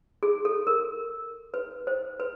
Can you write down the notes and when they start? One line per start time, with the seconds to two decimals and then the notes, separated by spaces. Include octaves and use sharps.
0.23 G#4
0.45 A4
0.67 A#4
1.54 B4
1.87 C5
2.20 B4